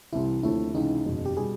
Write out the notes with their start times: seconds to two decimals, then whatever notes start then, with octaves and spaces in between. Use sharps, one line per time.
0.12 C2 C3 E3 E4
0.43 D#2 D3 F3 A3 C4 E4
0.74 C#2 C3 E3 D#4
1.05 F#1 E2 B2
1.26 G4
1.37 B2 G3 G#4